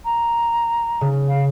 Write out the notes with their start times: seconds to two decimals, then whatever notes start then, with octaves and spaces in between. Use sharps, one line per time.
0.04 A#5
1.01 C#3
1.27 F5